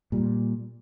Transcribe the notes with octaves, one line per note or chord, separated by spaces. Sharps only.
A#2 G3